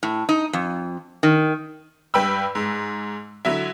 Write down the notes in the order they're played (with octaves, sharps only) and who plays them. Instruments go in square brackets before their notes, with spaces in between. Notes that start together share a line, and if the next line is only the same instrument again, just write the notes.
[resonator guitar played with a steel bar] A2
D#4
F2
D#3
[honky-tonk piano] G2 B4 G5 B5 E6
G#2
D3 F#3 E4